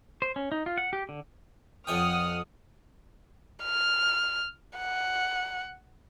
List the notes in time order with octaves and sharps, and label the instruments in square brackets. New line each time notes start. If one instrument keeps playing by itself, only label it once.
[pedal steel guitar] C5
C#4
D#4
F4
F#5
G4
D3
[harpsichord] F2 C#5 G5 [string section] F#5 D#6 F6
[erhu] F6
F#5